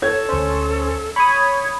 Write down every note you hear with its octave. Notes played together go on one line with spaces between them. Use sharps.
A4 C#5 G#6
D2 C#4 C5
C#5 B5 D#6 G#6